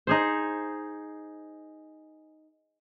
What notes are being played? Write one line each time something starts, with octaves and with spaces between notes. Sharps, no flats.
D#4 G#4 C5